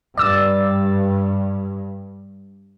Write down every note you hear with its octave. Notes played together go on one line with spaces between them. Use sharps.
G2 D5 E6 A6